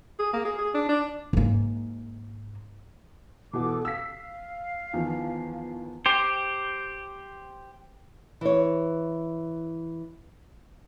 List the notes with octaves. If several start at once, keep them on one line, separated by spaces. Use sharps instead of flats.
G#4
A#3
G#4
G#4
D4
D4
G#2 A#3
B2 E3 F#4 A4 D6
F5 E6 B6
E2 D#3 F3
G4 C5
E3 C#5